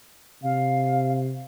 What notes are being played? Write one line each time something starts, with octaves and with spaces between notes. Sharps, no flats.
C3 F5